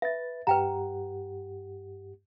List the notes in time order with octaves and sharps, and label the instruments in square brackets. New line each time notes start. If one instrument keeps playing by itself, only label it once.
[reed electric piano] B4 A6 [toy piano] E5
[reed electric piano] G2 G4 F#5 [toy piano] B4 G5 A#5